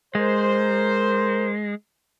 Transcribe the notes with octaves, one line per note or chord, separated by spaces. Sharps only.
G#3 A#4 C5